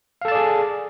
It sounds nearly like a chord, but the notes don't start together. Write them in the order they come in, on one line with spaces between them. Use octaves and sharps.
F5 A4 A5 D5 G#4